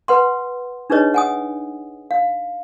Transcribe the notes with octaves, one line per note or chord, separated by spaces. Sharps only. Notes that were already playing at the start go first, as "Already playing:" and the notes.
B4 F#5 C6
D4 D#4 G#4 B4 C#5 D#5
F#5 G#5 D#6
F5